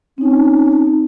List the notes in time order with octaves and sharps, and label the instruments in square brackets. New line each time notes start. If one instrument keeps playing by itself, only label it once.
[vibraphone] C4 D#4 [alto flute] C#4